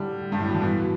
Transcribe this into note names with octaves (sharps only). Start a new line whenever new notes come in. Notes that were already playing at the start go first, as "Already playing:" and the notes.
Already playing: A2 D3 G3
G2
A2
B2
D3
B2 E3